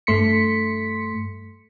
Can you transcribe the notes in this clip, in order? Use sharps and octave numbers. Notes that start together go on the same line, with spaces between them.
G2 A3 C6 B6 C#7